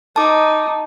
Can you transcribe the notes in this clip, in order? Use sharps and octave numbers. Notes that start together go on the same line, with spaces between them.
D#4 A5 D6